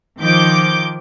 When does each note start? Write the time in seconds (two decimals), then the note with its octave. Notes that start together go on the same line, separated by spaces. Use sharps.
0.21 D#3 F3 D6 G6